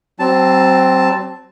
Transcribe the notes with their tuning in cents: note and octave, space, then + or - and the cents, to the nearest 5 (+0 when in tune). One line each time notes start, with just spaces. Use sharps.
F#3 +40 C4 +0 A5 +0